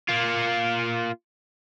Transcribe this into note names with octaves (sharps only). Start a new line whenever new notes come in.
A#3 F4